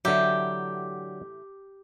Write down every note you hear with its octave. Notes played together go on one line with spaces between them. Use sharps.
A2 D3 E3 F#3 G4 E5